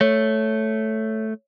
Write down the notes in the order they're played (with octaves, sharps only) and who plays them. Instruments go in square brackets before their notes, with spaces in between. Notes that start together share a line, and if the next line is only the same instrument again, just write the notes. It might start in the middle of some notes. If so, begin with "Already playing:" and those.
[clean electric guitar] A3 [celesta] C#5